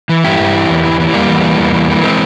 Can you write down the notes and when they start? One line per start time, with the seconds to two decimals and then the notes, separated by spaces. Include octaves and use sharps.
0.09 E3
0.24 G2 E4 G4
0.39 G2
0.54 E3
0.70 E2
0.85 E3
1.00 E3
1.14 E2 G3 A#3
1.29 E2
1.44 E3
1.59 E2
1.74 E3
1.90 E3
2.03 G#3 C4